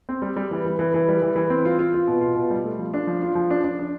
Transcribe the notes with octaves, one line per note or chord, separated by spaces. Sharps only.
C4
G3
G3
E3
E3
E3
E3
G3
E3
E3
C4
F4
F4
F4
B2
F4
B2
G3
A3
F3
D4
F3
F4
F3
D4
D4
D4